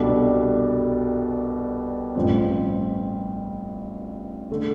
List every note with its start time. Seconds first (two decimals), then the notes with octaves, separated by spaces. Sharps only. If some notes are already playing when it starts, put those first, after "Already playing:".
Already playing: C2 B2 G3 D4 A4
2.15 A1 G2 F3 C4
4.51 D3 A3